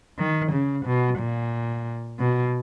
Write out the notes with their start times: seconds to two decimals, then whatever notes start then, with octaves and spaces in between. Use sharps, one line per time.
0.19 D#3
0.52 C#3
0.86 B2
1.19 A#2
2.19 B2